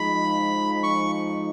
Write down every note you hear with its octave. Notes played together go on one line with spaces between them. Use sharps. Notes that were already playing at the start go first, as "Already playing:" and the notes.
Already playing: F3 G#3 D#4 B5
C#6